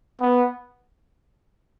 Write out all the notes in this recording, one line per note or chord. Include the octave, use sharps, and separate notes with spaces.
B3